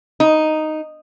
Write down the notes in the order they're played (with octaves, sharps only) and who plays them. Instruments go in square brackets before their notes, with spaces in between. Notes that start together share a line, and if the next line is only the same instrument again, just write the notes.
[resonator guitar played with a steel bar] D#4